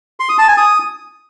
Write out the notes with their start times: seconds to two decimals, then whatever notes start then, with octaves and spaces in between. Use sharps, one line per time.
0.20 C6
0.29 D#6
0.38 A5
0.48 G#5
0.57 D#6